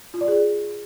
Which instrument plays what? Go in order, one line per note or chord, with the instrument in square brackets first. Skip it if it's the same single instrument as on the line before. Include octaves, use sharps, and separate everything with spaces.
[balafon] F4
D5
G#4